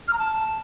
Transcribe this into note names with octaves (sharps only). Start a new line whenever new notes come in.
F6
A#5
A5